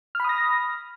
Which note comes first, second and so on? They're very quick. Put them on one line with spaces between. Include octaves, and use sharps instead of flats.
F6 B5 D#6 A#6